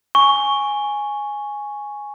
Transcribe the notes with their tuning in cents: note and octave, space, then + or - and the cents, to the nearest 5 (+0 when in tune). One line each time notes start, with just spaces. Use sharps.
G#5 +0 C#6 +0